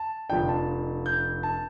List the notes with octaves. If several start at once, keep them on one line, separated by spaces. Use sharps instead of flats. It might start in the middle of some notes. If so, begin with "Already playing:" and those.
Already playing: A5
F1 F2 F3 D4 G5
A5
G6
A5